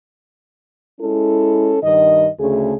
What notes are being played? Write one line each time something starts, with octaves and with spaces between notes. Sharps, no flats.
G#3 C#4 E4 A4
G2 D#3 D#5
D2 C#3 A3 G#4